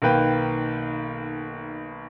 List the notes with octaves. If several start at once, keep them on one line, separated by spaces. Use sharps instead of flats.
B1 D#3 A#3 B4 G5